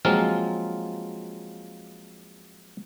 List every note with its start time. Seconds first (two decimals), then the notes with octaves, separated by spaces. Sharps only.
0.05 F3 F#3 G#3 A#3 C4 F4